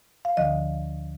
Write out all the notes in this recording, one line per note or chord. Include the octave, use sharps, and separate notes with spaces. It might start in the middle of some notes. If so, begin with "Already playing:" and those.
F5
D2 D3 F3 D#5